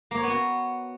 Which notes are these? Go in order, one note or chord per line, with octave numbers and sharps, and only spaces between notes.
A#3
C#5
B3
F#4